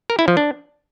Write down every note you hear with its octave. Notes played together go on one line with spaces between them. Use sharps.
A#4
E4
F3
D4